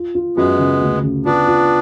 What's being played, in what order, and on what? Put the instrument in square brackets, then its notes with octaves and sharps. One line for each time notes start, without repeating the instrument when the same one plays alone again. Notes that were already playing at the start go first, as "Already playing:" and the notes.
Already playing: [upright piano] F4
F4
[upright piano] F#2 [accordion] G#3 B3
[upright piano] C#3
D2
C#3
[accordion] B3 D4 [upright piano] F4
[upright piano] F4